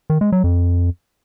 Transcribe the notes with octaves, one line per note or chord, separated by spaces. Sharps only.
D#3
G#3
F#3
F2